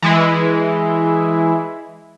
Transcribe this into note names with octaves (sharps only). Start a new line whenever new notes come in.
E3 G#3 E4